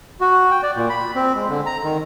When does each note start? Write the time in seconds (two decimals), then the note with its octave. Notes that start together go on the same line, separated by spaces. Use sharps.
0.21 F#4
0.51 G5
0.63 D5
0.76 A#2
0.90 B5
1.15 C4
1.35 G#3
1.50 D3
1.66 A#5
1.84 D#3